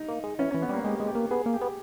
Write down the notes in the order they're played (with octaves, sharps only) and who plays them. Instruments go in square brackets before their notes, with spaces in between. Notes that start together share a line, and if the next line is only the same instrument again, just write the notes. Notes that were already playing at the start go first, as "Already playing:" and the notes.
Already playing: [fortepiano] D#4
[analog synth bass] A#3
G#3
[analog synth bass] E3 [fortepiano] C#4
[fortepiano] C#4
[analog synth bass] E3
[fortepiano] B3
[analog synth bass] G3 [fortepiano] A#3
[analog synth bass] G#3 [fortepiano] G4
[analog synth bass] G#3
[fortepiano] G4
[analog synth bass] A#3
[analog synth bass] B3 [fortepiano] G#4
[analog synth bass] A#3
[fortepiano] G4
[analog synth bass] B3